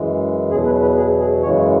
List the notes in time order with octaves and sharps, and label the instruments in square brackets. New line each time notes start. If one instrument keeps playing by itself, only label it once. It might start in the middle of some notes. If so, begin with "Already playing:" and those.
Already playing: [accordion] F#2 E3 G#3
E2 B2 F#3 G#4
B4
B4
G#4
G#4
F#2 C#3 E3 G#3 C#5